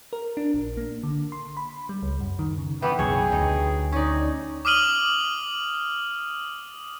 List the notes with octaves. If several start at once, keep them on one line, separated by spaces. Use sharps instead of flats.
A#4
D4
A#1
A#3
D3
C6
B5
G3
C#2
F#2
D#3
C#3
E3 B3 G4 G5
B1 F#2 C#3 G#4 C#5
D2 D#4
C#4 D#4 D5
D6 D#6 F6 D#7 F#7 G7